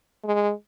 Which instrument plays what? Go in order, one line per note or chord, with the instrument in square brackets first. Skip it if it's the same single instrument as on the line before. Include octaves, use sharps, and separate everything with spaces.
[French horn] G#3